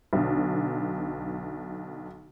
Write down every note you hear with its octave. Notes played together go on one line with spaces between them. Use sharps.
B1 D3